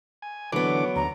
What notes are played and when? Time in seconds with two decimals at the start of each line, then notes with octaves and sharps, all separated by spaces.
0.22 G#5
0.52 D3 E3 F#3 B3 D6
0.96 D2 A#5